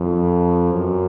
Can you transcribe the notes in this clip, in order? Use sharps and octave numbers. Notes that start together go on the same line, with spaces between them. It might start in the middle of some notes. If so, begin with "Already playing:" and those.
Already playing: F2
F#2